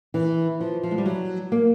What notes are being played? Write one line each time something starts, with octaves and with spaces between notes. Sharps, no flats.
E3
F3
F3
G#3
G3
F#3
A#3